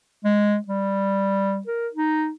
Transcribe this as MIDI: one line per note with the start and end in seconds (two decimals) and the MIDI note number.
0.24 0.57 56
0.68 1.61 55
1.67 1.88 70
1.93 2.31 63